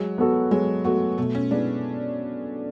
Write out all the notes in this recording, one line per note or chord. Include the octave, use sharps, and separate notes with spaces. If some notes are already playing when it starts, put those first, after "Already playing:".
Already playing: F#3 G#3
B3 F#4 A4
F#3 G#3
A3 B3 F#4 A4
B2 A3
C#4
G#3 B3 D4 E4